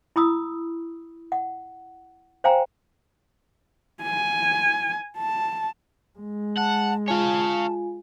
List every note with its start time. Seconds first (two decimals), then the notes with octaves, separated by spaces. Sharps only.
0.16 E4 B5 D#6 E6
1.32 F#5
2.44 C5 F5 G5 G#5 A#5
4.03 G#5
5.18 A5
6.19 G#3
6.57 F#5 A5
7.08 F4 C#5 F5 G#5 A5